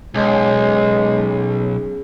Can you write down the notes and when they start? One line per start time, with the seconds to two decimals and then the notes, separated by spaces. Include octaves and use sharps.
0.14 B1 C#3 G#3